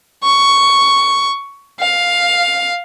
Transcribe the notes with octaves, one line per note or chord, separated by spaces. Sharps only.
C#6
F5